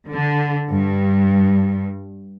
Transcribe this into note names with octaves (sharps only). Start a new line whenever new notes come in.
D3
G2